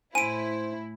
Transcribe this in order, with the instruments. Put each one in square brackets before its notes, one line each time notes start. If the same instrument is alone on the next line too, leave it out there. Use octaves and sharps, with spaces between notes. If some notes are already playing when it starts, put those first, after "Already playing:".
[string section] A2 E4 [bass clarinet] C5 [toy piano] G#5 [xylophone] D7 D#7